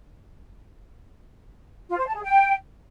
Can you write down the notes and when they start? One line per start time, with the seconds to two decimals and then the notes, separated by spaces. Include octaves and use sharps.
1.89 F4
1.97 C5
2.06 A5
2.14 G#4
2.22 G5